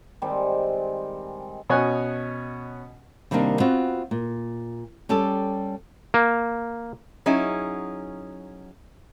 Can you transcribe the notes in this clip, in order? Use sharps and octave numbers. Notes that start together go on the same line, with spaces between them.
D#3 G3 G#3 C4
B2 C#4 C#5 D#5 G#5 F#6
C3 D#3 G3 A#3 D4
B3 C4 F4 F#4
A#2
G3 C#4 G4 A4
A#3
F#3 C#4 D#4 E4 G#4